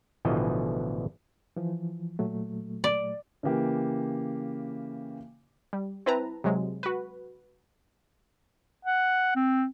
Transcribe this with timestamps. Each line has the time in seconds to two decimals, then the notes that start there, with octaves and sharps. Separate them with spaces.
0.25 A1 B2 D3 E3 F3 D#5
1.56 E3 F3
2.19 A#2 F#3 A3
2.84 D5
3.43 C#3 E3 A#3 G4
5.73 G3
6.06 C4 E4 B4 A5 A#5
6.44 C3 F#3 G#3
6.83 F#4 B4
8.85 F#5
9.36 C4